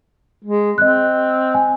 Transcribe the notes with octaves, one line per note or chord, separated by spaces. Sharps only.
G#3
C4 D#5 F#6
G#5